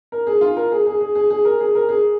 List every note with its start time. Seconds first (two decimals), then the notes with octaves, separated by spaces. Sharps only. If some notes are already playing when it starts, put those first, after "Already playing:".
0.12 A#4
0.27 G#4
0.41 F4
0.57 A#4
0.72 G#4
0.86 G#4
1.01 G#4
1.15 G#4
1.30 G#4
1.45 A#4
1.60 G#4
1.75 A#4
1.89 G#4